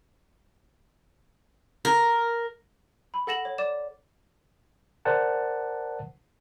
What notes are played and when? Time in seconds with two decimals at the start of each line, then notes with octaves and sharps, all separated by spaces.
1.85 A#4
3.14 B5
3.27 A4 F#5 A#6 E7 F#7
3.45 C#5
3.58 D5 D6 E7
5.05 A#4 C5 D5 F#5 A5